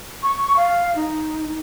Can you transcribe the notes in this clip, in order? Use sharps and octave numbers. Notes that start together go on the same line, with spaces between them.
C#6
F5
D#4